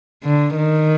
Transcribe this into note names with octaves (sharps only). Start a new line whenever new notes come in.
D3
D#3